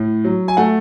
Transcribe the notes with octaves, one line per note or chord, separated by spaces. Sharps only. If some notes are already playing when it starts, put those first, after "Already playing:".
Already playing: A2
F#3
G#5
A3 F#5